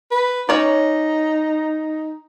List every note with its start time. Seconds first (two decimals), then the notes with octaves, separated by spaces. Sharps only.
0.11 B4
0.49 C#4 D#4 C#5 D5